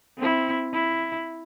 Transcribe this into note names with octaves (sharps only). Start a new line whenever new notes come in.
C4 E4
E4